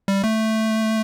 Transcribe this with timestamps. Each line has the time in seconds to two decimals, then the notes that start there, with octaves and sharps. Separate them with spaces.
0.08 G3
0.24 A3